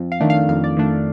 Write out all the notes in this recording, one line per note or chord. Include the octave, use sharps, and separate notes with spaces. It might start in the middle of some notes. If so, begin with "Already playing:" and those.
Already playing: F2
F5
D#3 A3 D4
F5
F2 F5
D5
D#3 A3 D4